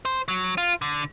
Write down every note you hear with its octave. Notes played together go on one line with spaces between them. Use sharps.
C5
F#3
F4
D3